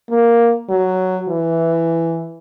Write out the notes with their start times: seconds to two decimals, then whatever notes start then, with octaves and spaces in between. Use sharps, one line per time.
0.10 A#3
0.69 F#3
1.28 E3